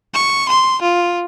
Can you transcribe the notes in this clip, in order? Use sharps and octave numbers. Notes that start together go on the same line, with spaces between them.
C#6
C6
F4